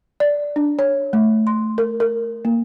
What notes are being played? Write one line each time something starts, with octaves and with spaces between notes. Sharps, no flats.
D5
D4
C#5
A3
C6
A#4
A#4
A#3